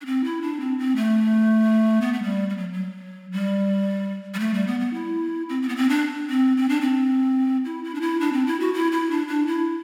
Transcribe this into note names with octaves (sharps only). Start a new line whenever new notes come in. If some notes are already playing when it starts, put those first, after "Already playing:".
D4
C4
E4
D4
C4
C4
A3
B3
A3
G3
G3
F#3
F#3
G3
G3
A3
G3
B3
B3
E4
C4
C4
B3
C4
D4
C4
C4
D4
C4
E4
E4
D4
E4
D4
C4
E4
F#4
E4
E4
D4
D4
E4